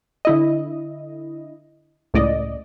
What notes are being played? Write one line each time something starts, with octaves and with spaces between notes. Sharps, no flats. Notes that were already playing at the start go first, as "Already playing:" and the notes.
D3 E4 D#5
C#2 A2 D5 D#5